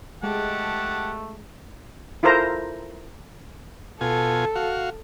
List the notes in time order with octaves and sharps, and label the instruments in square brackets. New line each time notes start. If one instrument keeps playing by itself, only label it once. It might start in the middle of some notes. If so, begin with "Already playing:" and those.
[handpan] G#3 [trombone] A3 [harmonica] G4 F#5 A5
[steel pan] E4 F4 A4 A#4 C5 A#5
[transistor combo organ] B2 F4 G#5 [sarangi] A4
[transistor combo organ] F#4 F5